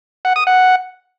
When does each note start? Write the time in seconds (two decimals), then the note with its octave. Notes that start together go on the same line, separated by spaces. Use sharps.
0.25 F#5
0.36 D#6
0.47 F#5